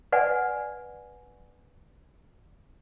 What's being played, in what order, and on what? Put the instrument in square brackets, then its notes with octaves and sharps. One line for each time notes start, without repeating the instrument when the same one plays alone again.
[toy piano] B4 D5 F#5 G#5